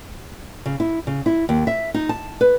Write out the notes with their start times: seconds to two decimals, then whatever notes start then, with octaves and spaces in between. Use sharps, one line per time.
0.66 C#3
0.80 E4
1.07 C#3
1.26 E4
1.49 D#2
1.67 E5
1.94 D#4
2.09 A5
2.41 B4